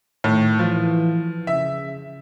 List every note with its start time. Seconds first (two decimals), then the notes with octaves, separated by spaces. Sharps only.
0.24 A2 D#3
0.59 E3 F3
1.47 C#3 E5